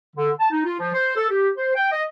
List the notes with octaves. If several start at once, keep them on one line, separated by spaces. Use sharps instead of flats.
D3
A5
D#4
F4
F3
C5
A4
G4
C5
G5
D#5